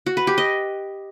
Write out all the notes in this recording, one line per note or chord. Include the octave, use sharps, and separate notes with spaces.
F#4
B4
G4
D#5